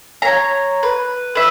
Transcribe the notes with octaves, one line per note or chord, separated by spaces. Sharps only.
C#5 A#5
B4
B4 E5